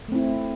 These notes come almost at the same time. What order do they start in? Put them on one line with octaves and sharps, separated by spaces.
A3 C4 E4